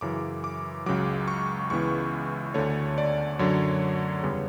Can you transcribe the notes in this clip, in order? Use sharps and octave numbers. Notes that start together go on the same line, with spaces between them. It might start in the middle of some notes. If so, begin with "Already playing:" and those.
F#2 C#3 E3 D6
D6
C#2 C#3 F#3 D6
C#6
C#2 C#3 E3 B3 C#6
D2 D3 A3 C#5
D5
F#2 D3 F#3 C#5
E2 C#3 G3 B3